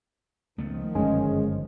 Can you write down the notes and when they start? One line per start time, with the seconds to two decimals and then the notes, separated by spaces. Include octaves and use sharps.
0.58 C#2 D#3 F3 A3 B3
0.95 G1 F#2 G#3 C#4